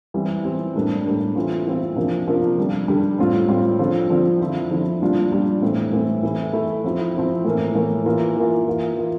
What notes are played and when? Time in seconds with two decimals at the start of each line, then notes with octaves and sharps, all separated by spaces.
0.14 E3 G3 C4
0.45 E3 G3 C4
0.75 A2 G3 A#3 D4
1.05 A2 G3 A#3 D4
1.36 E3 A3 C4 F4
1.66 E3 A3 C4 F4
1.96 C3 F3 A#3 D4 F4
2.28 C3 F3 A#3 D4 F4
2.58 D3 G3 D4
2.88 D3 G3 D4
3.18 A2 G3 C4 F4
3.48 A2 G3 C4 F4
3.79 D3 F3 C4 F4
4.10 D3 F3 C4 F4
4.40 D3 F3 C4 E4
4.71 D3 F3 C4 E4
5.01 A#2 G3 D4 F4
5.32 A#2 G3 D4 F4
5.62 A2 E3 A3 C4
5.93 A2 E3 A3 C4
6.23 E3 A3 E4
6.53 E3 A3 E4
6.84 F3 C4 E4
7.14 F3 C4 E4
7.45 A2 E3 A#3
7.75 A2 E3 A#3
8.06 E3 A#3 F4
8.36 E3 A#3 F4
8.67 E3 A#3 F4
8.97 E3 A#3 F4